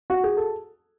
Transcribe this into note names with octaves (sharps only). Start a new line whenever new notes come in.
F#4
G#4
A4